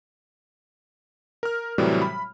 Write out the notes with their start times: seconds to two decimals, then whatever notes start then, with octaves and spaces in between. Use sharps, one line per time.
1.43 A#4 F6
1.78 A2 C3 E3 F#3 G3
2.02 B5